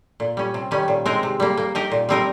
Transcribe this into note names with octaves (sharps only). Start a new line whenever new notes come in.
A#2
G3 C#4
C3
D#3 G3 C#4
A#2
G#3 C4 D#4 A#4
C3
G3 A#3
A#3
D#4 G4 A#4
A#2
G3 C4 D#4 A#4